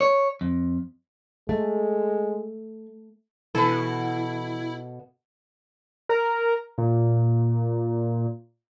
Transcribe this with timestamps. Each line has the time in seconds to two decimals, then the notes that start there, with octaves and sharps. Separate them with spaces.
0.01 C#5
0.41 F2
1.49 G#3 A3
3.55 B2 E3 E4 A4 B4
6.09 A#4
6.78 A#2